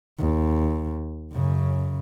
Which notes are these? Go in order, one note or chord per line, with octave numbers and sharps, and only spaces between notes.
D#2
F#2 C#3